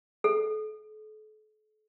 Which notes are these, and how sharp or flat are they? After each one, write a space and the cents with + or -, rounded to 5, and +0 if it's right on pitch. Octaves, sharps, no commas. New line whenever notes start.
A4 -40